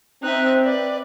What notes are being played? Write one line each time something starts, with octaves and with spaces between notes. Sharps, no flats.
C4 D#4 E5 F#6
B4 D5